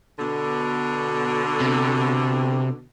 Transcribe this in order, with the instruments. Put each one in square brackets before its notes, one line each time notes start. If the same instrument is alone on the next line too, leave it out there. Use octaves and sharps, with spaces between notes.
[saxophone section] B2 D3
[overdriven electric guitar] C3